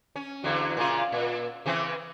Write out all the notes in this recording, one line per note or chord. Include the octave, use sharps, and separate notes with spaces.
C#4
E2 D3 F#3
A#2 C#3 F4
A#2
C#3 E3 C4